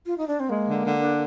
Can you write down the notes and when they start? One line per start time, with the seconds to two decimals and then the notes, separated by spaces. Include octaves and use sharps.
0.06 F4
0.18 D#4
0.28 D4
0.40 C4
0.50 G#3 A#3
0.67 D3
0.84 D3
1.01 D4